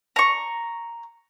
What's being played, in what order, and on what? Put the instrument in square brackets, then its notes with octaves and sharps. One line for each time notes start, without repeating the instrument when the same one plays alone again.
[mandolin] A#5 C#6